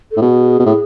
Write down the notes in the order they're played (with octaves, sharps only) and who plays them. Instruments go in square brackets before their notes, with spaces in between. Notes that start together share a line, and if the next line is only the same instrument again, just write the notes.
[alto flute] A4
[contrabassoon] A2
[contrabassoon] B2 [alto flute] G#4
[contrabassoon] B2
A2